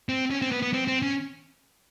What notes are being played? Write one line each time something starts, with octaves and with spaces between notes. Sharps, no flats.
C4
C#4
C4
B3
B3
C4
C4
C#4